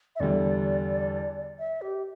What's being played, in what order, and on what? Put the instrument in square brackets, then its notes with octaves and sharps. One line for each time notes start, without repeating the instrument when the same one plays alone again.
[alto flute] E5
[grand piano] E2 D3 G3 [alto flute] D5
[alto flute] E5
G4